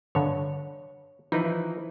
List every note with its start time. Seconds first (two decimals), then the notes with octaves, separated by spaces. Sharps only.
0.15 G2 D3 C#5
1.32 E3 F3 D#4 B4